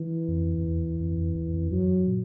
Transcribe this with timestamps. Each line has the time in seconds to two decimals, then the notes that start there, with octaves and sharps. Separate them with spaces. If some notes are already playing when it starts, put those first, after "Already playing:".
Already playing: E3
0.28 F2
0.58 F2
0.64 E2
1.00 F2
1.17 F2
1.35 E2
1.53 F2
1.71 F#2 F#3
2.07 A#2